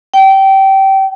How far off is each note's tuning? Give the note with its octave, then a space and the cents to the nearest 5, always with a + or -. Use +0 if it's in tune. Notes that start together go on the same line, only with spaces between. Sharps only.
G5 -20